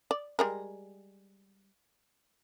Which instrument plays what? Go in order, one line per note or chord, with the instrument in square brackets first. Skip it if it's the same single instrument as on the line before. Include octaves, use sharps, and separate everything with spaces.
[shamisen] D5
G3 G#3 A#4